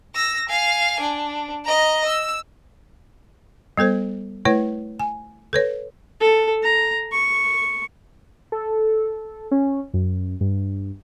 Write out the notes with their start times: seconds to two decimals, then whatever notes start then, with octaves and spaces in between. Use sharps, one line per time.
0.15 E6 A#6
0.49 F5 G#5
1.00 D4
1.65 D#5 A#5
2.06 E6
3.77 G3 B3 A4 C5
4.45 A3 E4 B4 C#5
4.99 G#5
5.53 A4 B4 C#5
6.21 A4
6.63 A#5
7.12 C#6
8.52 A4
9.51 C#4
9.94 F#2
10.40 G2